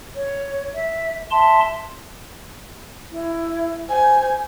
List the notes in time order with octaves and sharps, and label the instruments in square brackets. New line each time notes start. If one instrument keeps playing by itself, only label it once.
[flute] C#5
E5
[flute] E5 [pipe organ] A5 C6
[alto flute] E4
[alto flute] C5 [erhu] G#5